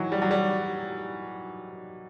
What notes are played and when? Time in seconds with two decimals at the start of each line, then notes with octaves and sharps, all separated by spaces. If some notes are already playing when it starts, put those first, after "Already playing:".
Already playing: D#3 E3 F#3
0.12 G3
0.22 F#3
0.31 G3